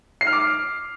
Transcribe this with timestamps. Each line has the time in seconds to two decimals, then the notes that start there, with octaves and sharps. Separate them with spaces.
0.21 C7
0.27 F6
0.33 D6